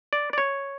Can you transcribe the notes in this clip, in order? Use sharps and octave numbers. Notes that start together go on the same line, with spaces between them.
D5
D5
C#5